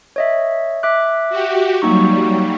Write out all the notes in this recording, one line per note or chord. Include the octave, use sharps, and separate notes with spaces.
C#5 D#5 E5
E5 D6 F#6
F#4 G4
F#3 G3 A#3 D#4 C#6